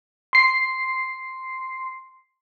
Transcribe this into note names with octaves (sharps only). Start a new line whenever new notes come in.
C6 C7